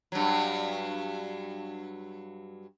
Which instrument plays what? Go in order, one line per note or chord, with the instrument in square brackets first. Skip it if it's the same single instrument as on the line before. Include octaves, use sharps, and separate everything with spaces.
[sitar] G2 F#3